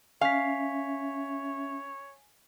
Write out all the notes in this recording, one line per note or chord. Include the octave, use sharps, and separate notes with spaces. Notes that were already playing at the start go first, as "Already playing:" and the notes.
C#4 C#5 E5 F5 G#5 B6